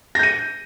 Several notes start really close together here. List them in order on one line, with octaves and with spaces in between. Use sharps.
A#6 G6 D#7